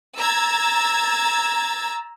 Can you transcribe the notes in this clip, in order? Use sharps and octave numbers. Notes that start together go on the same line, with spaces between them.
A#5 E6 G#6 A6